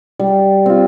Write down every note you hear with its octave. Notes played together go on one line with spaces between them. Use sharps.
G3
C4 F4